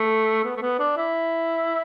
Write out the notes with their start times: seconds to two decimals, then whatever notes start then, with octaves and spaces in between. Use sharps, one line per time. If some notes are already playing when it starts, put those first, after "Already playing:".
Already playing: A3
0.44 B3
0.57 A3
0.62 B3
0.79 D4
0.97 E4